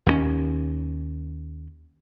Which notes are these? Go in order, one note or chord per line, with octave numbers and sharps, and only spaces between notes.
D#2 G#3 C#4